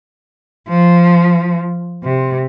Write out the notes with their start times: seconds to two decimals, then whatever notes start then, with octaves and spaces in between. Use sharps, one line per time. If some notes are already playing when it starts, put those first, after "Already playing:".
0.69 F3
2.04 C3